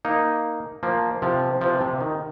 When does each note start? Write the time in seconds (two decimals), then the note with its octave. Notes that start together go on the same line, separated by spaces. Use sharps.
0.05 A#3 D#4
0.83 F3 A#3
1.22 C3 F3
1.61 C3 F3
1.81 C3
2.01 D#3